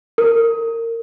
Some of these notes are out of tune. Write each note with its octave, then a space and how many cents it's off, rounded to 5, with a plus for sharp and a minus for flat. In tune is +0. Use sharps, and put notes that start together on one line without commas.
A#4 -25